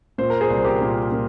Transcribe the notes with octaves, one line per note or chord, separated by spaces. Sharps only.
A#2 C5
A#4
G#4 C5
C2
C5
G4 A#4
A#2
A#2